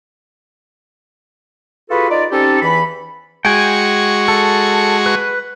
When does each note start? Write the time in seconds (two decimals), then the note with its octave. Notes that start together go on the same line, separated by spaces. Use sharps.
1.90 F4 F#4 G#4 A4 B4
2.09 D#4 F4 D5
2.30 C4 C#4 D#4 G4 A4
2.61 E2 E3 B5
3.45 G#3 F#4 G5 G#5 C#6
4.28 A4
5.06 B4